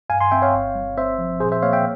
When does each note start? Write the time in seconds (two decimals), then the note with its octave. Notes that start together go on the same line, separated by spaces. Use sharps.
0.10 G2 F5 G#5
0.21 G#5 C6
0.31 C4 E5 G5
0.42 C#5 F5
0.54 G1
0.75 G3
0.97 C4 C5 E5
1.18 F3
1.40 A#2 G#4 C5
1.52 C5 E5
1.62 A#3 C#5 F5
1.73 E5 G5